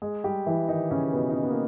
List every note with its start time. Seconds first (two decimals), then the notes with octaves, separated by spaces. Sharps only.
0.02 G#3 G#4
0.24 G3 G4
0.46 E3 E4
0.68 D#3 D#4
0.91 C#3 C#4
1.13 B2 B3
1.29 D#4
1.36 C#4
1.43 B3
1.50 A#3